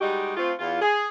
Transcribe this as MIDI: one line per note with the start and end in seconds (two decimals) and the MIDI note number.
0.01 0.35 55
0.01 0.35 56
0.01 0.35 63
0.01 0.35 66
0.01 0.35 67
0.36 0.51 57
0.36 0.51 60
0.36 0.51 65
0.59 0.78 40
0.59 0.78 65
0.81 1.07 68